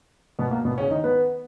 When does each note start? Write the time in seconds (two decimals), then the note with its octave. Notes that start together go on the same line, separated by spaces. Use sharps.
0.39 B2 B3
0.51 A#3
0.65 B2 B3
0.78 C#3 C#4
0.90 D#3 D#4
1.04 B3 B4